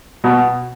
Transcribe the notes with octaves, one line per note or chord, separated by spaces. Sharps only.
B2